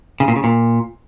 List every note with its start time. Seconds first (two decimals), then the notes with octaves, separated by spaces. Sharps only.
0.20 C#3
0.28 A#2
0.36 C#3
0.44 A#2